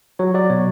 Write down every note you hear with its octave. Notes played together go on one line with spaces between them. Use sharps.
F#3 C#5
F#3 D5
B2 C#5